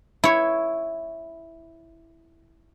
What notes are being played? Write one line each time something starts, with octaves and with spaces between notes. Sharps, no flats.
E4 C#5